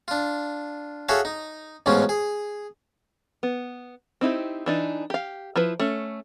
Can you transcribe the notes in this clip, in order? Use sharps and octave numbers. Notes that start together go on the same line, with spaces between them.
D4 F4
F#4 G#4 A4 C#5 E5 F5
D#4
A1 G#2 B2 F#3 C#4 F4
G#4
B3
C4 D#4 E4 G4
E3 D4 D#4
G4 F5
F3 E4 B4
A3 C#4